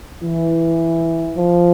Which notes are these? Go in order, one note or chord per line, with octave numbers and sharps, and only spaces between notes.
E3
F3